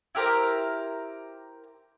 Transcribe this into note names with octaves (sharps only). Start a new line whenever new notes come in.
E4 G4 A#4 C5